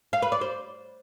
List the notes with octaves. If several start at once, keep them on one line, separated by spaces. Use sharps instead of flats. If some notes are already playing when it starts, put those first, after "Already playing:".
F5
B4
D5
C5